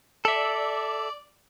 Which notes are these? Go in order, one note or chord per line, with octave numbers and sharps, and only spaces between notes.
A4 D5 E5